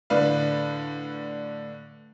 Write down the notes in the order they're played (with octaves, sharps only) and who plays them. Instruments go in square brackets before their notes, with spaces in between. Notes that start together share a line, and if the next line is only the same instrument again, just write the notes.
[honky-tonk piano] A2 D3 D4 B4 F5